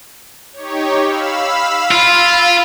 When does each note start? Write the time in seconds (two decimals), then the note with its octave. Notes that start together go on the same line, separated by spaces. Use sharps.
0.53 D#4 G4 C#5
1.03 F5 B5 E6
1.91 F4